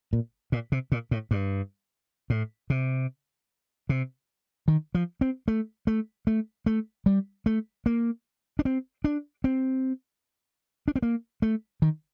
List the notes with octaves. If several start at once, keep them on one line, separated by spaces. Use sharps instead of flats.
A#2
A#2
C3
A#2
A2
G2
A2
C3
C3
D#3
F3
C4
A3
A3
A3
A3
G3
A3
A#3
D4
C4
D4
C4
D4
C4
A#3
A3
D#3